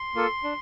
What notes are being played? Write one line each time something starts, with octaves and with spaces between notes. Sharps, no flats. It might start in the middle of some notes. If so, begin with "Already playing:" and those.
Already playing: C6
A#3 F4 A4
D4